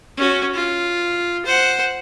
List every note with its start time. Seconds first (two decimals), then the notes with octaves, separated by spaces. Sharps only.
0.17 C#4 F#4
0.54 F4
1.46 C5 F#5